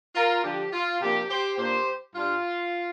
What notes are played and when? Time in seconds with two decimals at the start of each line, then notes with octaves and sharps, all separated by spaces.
0.15 F4 A#4
0.43 D3 F3 D4 G4
0.72 F4
1.00 C3 F3 A#3 D4 G4
1.29 G4 C5
1.58 A#2 A#3 D4 G4 C5
2.15 G2 G3 D4 F4